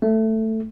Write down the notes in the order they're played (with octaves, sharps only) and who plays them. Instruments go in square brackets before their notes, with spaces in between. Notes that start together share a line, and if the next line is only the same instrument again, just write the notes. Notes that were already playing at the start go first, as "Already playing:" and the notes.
[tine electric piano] A3